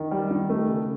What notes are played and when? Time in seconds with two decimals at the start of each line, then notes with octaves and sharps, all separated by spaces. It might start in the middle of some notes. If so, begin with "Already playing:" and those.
Already playing: D#3
0.11 G3
0.31 D#3
0.50 A3
0.68 C#3